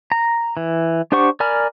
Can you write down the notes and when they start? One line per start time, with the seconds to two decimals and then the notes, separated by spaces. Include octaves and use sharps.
0.12 A#5
0.57 E3
1.12 D4 G4 C5 F#5 C#6
1.40 A#4 D5 G#5 B5 F6